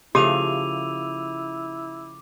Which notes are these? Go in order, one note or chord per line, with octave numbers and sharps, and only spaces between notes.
C#3 F3 A3 E4 G4 D6 D#7 F7